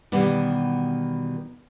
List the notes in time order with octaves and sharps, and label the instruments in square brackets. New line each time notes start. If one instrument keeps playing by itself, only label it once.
[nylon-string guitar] B2 D#3 E3 G3 B3